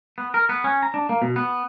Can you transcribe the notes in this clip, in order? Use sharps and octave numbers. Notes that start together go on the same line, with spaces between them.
B3
A#4
B3
C#4
A#5
D4
A#3
B2
B3